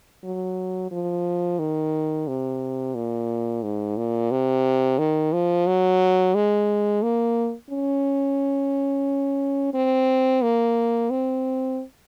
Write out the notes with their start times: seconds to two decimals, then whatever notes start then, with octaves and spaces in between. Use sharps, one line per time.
0.24 F#3
0.91 F3
1.59 D#3
2.27 C3
2.95 A#2
3.63 G#2
3.97 A#2
4.31 C3
4.99 D#3
5.33 F3
5.67 F#3
6.35 G#3
7.03 A#3
7.70 C#4
9.74 C4
10.42 A#3
11.10 C4